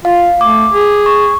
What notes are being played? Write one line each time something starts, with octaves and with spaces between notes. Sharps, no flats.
F4 F5
A3 D6
G#4
C#6